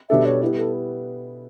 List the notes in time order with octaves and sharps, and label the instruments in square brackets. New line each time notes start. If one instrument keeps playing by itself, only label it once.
[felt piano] B2 G3 D4 A4 [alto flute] E5
[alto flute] C#5
[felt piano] G3 B3 E4 B4
[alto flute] A4